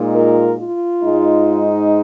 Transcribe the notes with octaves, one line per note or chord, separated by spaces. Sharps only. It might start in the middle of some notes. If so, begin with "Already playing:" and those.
Already playing: A#2 G#3 D#4
F4 A#4
F4
G#2 G#3 D#4